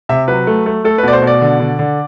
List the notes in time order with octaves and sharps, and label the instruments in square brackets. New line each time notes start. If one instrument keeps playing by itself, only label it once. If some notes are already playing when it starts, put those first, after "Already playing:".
[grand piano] C3 E5
F#3 B4
A3
A3
A3 A4
B4
B2 D5
C5
B2
D5
D3
D3
D3